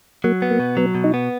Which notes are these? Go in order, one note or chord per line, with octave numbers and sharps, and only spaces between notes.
F#3 A#3
B3
A#3
B2
F#3 B3
B2
D#4
B3